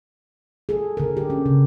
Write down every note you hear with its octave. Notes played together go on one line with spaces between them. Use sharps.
G#4 A4
D3 A#4
G4
C#4
C#3